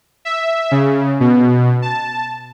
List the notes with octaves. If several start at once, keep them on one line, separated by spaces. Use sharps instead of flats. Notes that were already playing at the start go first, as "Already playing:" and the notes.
E5
C#3
B2
A5